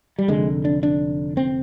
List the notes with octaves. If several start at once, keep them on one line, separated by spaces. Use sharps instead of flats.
G3
F1 F2 D3 G#3
D4
D4
C4